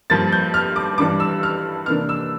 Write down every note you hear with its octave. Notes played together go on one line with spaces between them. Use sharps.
G2 F3 A#3 A6
G6
F6
D6
G2 E3 G3 D4 D6
E6
F6
C3 E3 A#3 D4 F6
E6